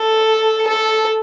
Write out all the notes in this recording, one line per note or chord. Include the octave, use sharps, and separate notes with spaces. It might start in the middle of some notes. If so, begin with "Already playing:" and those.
Already playing: A4
A4